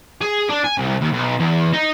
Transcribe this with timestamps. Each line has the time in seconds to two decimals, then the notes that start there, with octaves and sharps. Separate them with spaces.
0.21 G#4
0.49 D4
0.64 G#5
0.78 C2
1.01 D#2
1.13 B1
1.40 E2
1.74 D#4